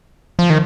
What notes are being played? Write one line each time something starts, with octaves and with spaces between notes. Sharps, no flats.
F3
D#3